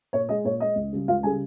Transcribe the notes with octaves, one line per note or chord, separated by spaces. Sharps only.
A#2 C#5
G#3 D#5
A#2 C#5
G#3 D#5
C#2
C#3 G3
C#2 F4 F5
C#3 G3 G#4 G#5